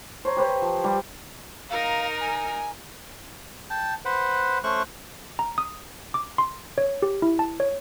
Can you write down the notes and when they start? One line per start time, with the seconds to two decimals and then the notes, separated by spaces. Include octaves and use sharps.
0.25 C5 C#5 A#5
0.37 G4 B4 C5
0.62 F3
0.84 G3 G4
1.70 D#4 A#4 F5
2.20 G#5
3.70 G5 A5
4.05 B4 C5 F#5
4.64 A3 C#4 C5 C#6 F#6
5.39 A#5
5.58 D#6
6.14 D6
6.38 C6
6.78 C#5
7.02 G4
7.22 E4
7.39 A5
7.60 C#5